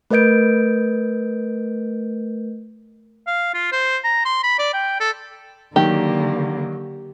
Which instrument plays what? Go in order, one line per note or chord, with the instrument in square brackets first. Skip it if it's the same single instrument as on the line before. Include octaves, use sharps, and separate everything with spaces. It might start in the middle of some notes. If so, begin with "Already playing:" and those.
[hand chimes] A3 A#4 B4 D#5 G6 D7
[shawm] F5
F4
C5
A#5
C6
B5
D5
G5
A4
[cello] D3 A#3 [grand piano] D#3 F#3 [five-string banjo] G4